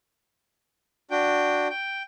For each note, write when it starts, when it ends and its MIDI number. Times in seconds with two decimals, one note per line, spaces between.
1.11 1.68 62
1.11 1.68 66
1.11 1.68 79
1.70 2.03 79